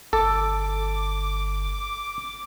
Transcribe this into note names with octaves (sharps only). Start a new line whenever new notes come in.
G1 A4 D6